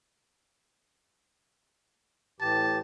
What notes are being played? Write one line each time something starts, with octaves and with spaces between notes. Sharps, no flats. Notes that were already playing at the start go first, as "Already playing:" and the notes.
A2 E3 G4 A5